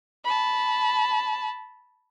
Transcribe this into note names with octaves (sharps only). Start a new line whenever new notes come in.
A5 B5